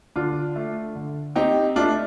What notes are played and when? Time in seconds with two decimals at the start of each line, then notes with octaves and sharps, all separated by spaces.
0.16 D3 D4 F4
0.56 A3
0.95 D3
1.36 C4 D#4 G4
1.76 A3 D4 F4